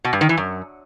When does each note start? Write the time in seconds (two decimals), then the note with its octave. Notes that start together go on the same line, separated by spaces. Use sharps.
0.04 B2
0.13 G2
0.21 D#3
0.29 E3
0.37 F#2